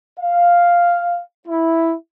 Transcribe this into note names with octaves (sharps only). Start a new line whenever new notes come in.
F5
E4